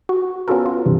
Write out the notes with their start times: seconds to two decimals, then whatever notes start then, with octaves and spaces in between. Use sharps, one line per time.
0.09 F#4
0.48 B3 C#4 F4 F#4 A4 A#4
0.66 F4
0.86 G2 C3 E3